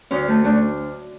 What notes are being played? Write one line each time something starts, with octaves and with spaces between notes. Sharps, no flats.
D2 C#4
A3
A3 D4